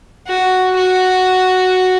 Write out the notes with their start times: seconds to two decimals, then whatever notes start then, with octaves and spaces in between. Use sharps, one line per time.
0.28 F#4
0.77 F#4